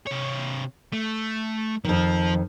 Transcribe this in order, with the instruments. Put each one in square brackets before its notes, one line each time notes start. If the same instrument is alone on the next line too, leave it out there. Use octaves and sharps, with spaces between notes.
[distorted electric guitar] C3 C#5
A3
[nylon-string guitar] F2 D#3 [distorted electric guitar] F3 A5